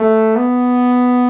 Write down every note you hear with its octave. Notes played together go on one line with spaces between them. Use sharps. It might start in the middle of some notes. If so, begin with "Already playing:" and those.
Already playing: A3
B3